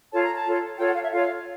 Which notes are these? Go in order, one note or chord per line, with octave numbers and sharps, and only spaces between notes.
F4 A4 C#5 A5
A#5
A5
F4 A4 C#5
F4 A4 C#5 G5
F#5
F5
E5
F4 A4 C#5 F5